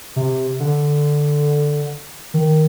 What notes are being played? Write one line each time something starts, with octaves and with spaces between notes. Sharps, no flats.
C3
D3
D#3